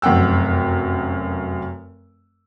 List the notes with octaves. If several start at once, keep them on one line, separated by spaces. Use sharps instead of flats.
F1 F#2 F#5 G5 E6